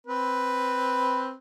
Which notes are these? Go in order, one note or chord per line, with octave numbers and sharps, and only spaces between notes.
C4 B4